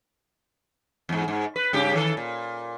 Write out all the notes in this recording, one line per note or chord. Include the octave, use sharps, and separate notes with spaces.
E2 G#2
G#2
B4
G2 C#3 G4
D#3 A4
A#2